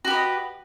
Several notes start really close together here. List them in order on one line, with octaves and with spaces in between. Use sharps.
F#4 G4 B4 D#5